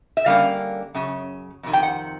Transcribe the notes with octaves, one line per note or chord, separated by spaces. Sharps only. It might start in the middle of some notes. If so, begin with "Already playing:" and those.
E5
D3 G3 A#3 C#4 F5
F#2 C#3
F2 C3 D#3
G5
F#5